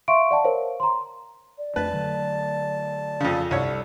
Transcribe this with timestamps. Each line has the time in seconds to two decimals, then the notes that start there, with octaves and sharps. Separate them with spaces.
0.08 E5 F5 C6 C#6 D7
0.31 D5 F#5 A5
0.44 A#4 C5 C#5 F5
0.80 A#5 C6
1.58 D5
1.76 F2 A3 D4 B4 A5
1.91 D3 F#3 A3
3.20 F2 C#3
3.51 C2 G2 A4 C#5 D5